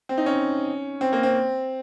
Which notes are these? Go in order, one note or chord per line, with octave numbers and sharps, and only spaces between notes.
C4
D#4
C#4
C4
A#3
C4